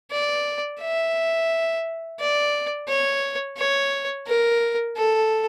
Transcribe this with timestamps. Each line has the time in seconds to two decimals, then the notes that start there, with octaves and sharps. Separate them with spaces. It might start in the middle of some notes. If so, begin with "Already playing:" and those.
0.12 D5
0.80 E5
2.20 D5
2.88 C#5
3.58 C#5
4.27 A#4
4.97 A4